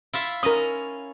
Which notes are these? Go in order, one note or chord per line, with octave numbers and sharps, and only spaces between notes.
E4 F4 E5
C#4 A#4 A#5 D#6